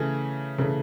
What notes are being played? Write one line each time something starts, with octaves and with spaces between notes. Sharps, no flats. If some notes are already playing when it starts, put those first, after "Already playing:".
Already playing: C#3 E3 A3 G#5
C#3 E3 A3